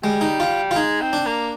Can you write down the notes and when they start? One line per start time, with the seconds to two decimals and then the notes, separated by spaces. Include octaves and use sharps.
0.03 G3 G#3
0.21 D#4
0.40 F4
0.71 F4
0.76 G#3 D#4
1.01 C4
1.13 D4
1.26 A#3